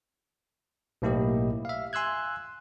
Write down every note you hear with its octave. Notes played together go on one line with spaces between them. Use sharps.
B1 A2 A#3 E4 G4 D#5
E5 F5
G#5 C6 E6 F#6 G#6